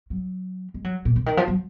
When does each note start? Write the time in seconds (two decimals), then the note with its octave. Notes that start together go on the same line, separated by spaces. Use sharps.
0.10 F#3
0.74 G#3
0.84 F#3
1.05 A#2
1.16 D3
1.26 D#3
1.37 F3
1.48 F#3